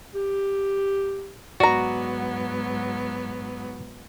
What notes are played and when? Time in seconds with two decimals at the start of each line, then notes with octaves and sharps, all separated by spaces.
0.15 G4
1.60 G#2 F#3 B3 F#4 D5 A#5